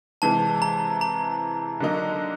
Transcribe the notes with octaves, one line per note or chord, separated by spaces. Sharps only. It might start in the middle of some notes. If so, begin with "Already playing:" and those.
C3 E3 G#3 A5
A#5
A#5
D3 F#3 A#3 D#4